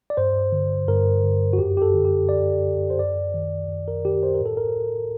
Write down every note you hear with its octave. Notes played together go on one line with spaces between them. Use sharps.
D5
G2 C5
D3
G2 A#4
D3
F#4
F#2 G4
G4
A4
D3
G4
F#2 D5
D3
C5
F#2 D5
D#3
F#2
A#4
D#3 G4
C5
A#4
A2
A4
A#4